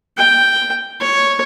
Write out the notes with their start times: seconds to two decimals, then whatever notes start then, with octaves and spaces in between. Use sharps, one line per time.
0.17 G5
1.01 C#5